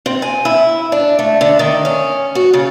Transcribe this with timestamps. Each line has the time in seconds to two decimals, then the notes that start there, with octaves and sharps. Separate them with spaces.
0.06 C4
0.22 G#5
0.45 E4
0.92 D4
1.19 A3
1.41 D3
1.59 D#3
1.85 C#4
2.35 F#4
2.54 C#3